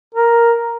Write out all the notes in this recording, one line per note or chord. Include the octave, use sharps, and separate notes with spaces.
A#4